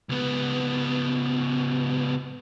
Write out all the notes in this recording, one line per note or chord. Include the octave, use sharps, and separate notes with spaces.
C#2 B3